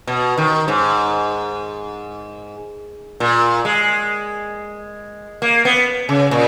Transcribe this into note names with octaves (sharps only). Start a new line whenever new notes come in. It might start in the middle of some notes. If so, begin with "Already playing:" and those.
B2
D#3
G#2
A#2
G#3
A#3
B3
C#3
A#2